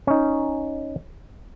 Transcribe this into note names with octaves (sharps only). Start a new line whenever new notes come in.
C#4 D#4